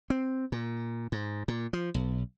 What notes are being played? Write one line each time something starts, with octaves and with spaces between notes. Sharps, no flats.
C4
A#2
G#2
A#2
F3
B1